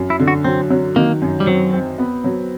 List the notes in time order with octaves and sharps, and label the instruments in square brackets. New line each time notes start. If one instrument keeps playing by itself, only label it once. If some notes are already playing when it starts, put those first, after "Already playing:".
Already playing: [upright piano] F#2
[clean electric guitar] E4
[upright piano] D3
[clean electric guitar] F#4
[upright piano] F#3 [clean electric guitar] C4
[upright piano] F#3
[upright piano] D#3 [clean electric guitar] A#3
[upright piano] F#2
[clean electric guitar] G3
[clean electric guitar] F#3 [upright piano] C4
[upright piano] C4
B3
F#3